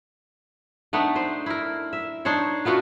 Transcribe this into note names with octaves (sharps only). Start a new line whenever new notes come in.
A3 B3 D4 D#4
C5
E4 A#4
E5
D4 D#4 C5 C#5
A3 B3 F4 F#4